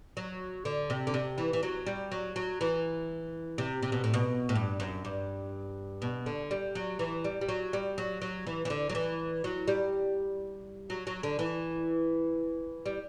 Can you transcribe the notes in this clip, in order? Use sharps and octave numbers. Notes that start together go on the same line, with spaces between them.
F#3
D3
C3
D3
C3
E3
E3
F#3
G3
F#3
F#3
E3
C3
C3
B2
A2
B2
A2
G2
F#2
G2
B2
D3
G3
F#3
E3
G3
G3
F#3
G3
F#3
F#3
E3
E3
D3
F#3
E3
F#3
G3
F#3
F#3
D3
E3
G3